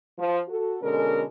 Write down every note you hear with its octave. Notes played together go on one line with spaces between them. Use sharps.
F3
F#4 A4
B2 D3 G#3 C#4 A4 A#4